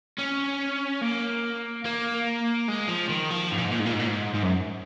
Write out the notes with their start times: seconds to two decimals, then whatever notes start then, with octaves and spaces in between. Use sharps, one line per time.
0.19 C#4
1.02 A#3
1.85 A#3
2.68 G#3
2.89 F3
3.09 D#3
3.30 F3
3.51 G#2
3.58 A#2
3.65 G#2
3.71 A#2
3.79 G#2
3.86 A#2
3.93 G#2
4.00 A#2
4.07 G#2
4.34 G#2
4.43 F#2